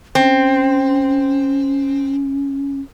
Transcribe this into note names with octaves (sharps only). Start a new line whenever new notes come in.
C4 C#4